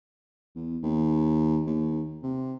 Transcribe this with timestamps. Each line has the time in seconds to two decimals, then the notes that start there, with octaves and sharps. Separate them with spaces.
0.55 E2
0.83 D#2
1.67 D#2
2.23 C3